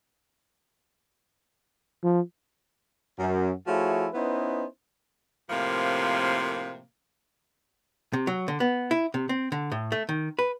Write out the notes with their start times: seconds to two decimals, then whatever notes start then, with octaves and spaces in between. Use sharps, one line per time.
2.03 F3
3.18 F#2
3.66 F3 A3 E4 F#4 G#4 C#5
4.14 B3 C#4 D#4 E4 B4 C5
5.50 A2 C3 F3 A#3
8.13 C3
8.27 F#3
8.48 D3
8.60 B3
8.91 E4
9.14 C3
9.29 C4
9.52 D3
9.72 A2
9.92 A3
10.09 D#3
10.39 B4